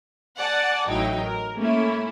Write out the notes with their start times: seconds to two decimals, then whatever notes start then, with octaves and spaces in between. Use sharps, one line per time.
0.38 D5 F#5 G#5 A5
0.88 A1 F#3 D#4 E4 G5
1.21 A#4
1.57 A3 A#3 C#4 E4